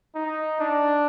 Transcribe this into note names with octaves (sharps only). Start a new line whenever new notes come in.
D#4
D4